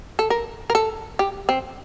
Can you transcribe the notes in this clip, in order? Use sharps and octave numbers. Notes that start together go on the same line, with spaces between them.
A4
A#4
A#4
A4
G4
C4